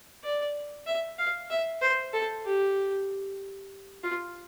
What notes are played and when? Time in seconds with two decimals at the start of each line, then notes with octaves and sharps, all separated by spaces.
0.24 D5
0.87 E5
1.18 F5
1.50 E5
1.82 C5
2.13 A4
2.45 G4
4.03 F4